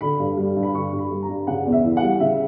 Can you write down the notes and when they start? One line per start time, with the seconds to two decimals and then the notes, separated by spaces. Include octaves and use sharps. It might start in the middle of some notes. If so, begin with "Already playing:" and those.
0.01 D3 B5
0.20 G2
0.37 G3
0.56 G2
0.63 B5
0.74 D3 C#6
0.92 G2
0.98 B5
1.11 G3
1.23 A#5
1.29 G2
1.47 C#3 F#5
1.66 E2
1.72 E5
1.84 E3
1.97 F#5
2.02 G3
2.20 C#3 E5